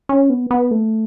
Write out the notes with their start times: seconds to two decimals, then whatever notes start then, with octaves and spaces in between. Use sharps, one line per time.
0.09 C#4
0.30 B3
0.51 B3
0.71 A3